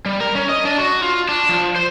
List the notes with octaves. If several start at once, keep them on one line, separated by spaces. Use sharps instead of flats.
G3
A#4
C#4
D#5
D4
F#4
F4
D4
F3
C5